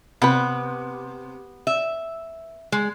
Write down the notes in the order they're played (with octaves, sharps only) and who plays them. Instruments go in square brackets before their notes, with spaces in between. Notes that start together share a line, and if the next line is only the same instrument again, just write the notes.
[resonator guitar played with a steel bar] C3 [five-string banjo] B3 B4
[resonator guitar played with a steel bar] E5
G#3